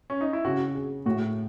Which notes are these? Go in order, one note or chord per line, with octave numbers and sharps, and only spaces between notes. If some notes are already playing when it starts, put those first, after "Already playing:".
C#4
D#4
E4
C#3 F#4
G#4
A2 F#4